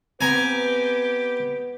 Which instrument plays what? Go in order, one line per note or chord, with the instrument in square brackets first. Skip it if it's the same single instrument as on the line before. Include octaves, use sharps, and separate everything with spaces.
[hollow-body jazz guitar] B3 C4 [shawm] G4 [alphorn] B4 [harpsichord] G#5 A#5